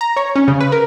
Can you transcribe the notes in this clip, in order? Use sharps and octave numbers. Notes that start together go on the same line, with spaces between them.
A#5
C#5
C#4
C#3
B4
A#4